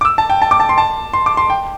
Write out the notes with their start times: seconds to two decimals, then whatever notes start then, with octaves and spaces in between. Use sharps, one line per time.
0.01 D6
0.05 E6
0.18 A5
0.30 G5
0.42 A5
0.51 D6
0.60 A5
0.69 C6
0.78 A5
1.13 C6
1.26 D6
1.37 C6
1.50 G5